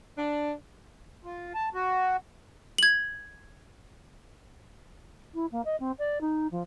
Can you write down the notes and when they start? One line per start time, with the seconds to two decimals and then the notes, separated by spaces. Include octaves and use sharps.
0.18 D4
1.24 F4
1.54 A5
1.74 F#4
2.78 G#6 F#7
5.34 E4
5.52 A#3
5.65 D#5
5.80 C4
5.98 D5
6.21 D#4
6.51 F3